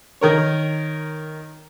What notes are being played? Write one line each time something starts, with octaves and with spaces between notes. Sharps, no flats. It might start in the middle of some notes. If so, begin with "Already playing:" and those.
D#3 A#4 C#5